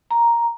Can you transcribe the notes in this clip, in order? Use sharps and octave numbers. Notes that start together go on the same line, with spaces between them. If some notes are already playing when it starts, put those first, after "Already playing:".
A#5